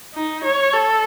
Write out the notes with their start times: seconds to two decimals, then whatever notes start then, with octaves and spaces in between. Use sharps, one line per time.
0.14 D#4
0.44 C#5
0.73 A4